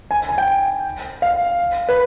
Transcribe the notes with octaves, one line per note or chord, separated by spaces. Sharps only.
G#5
G#5
G5
F5
B4